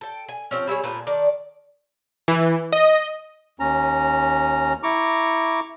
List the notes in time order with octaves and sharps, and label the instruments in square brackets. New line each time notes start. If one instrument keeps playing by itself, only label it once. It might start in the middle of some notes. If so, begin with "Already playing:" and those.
[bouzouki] A4 G5
G#5
F3 C4 C#4
G3 E4 G#4 C#5
A#2 A3 C4 B4
D#3 A4 D5
[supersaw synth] E3
D#5
[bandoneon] D#2 C#4 A#5
E4 A#5 C#6 D6